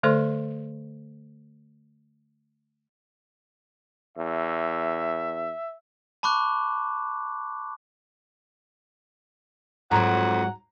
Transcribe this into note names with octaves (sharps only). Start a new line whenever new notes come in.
D3 A3 A4 C5 D5 C6
E2 E5
A5 B5 C#6 D6 F#6
F2 G#2 F#3 F#5 A#5